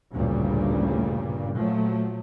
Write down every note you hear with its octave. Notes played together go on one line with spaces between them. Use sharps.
A1 D2 G2 A#2 C#3 G3
A#2 F3 F#3 A3